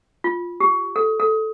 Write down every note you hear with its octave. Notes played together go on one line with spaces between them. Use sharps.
F4
G4
A4
A4